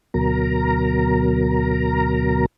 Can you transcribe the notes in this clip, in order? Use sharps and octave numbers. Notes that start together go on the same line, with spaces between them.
D2 B2 F#3 A#4 A#5